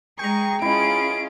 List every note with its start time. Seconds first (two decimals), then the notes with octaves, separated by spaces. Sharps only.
0.19 G#3 G#4 G5 A#5 C#6
0.62 C#4 E4 F4 G#4 D#5 D7